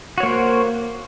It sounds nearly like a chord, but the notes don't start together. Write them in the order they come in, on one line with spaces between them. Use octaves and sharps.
F#4 C#5 A#3 C5